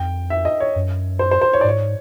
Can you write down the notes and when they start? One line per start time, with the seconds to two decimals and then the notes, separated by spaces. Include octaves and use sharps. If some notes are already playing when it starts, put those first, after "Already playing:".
Already playing: F2 G5
0.30 E5
0.45 D#5
0.60 C#5
0.76 F#2
1.19 C5
1.31 C5
1.42 C5
1.53 C#5
1.61 D5
1.64 G#2 C#5